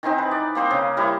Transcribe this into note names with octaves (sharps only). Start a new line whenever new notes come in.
D#3 E3 C4 D#4
B4
D5
A#3 C4 C5 D#5
C#3
G3 E4 A#4 C5